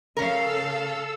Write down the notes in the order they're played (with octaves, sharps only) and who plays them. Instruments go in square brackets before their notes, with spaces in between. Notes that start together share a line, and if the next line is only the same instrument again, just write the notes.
[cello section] C#3 F5 [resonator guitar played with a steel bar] C#4 A#4 [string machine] A4 E6